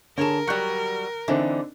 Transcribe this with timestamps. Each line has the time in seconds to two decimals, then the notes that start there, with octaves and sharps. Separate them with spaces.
0.18 D3 G#4 A#4 C#5 A5
0.47 F#3 G3 F#6 C#7
1.28 D3 E3 C4 D4 D#4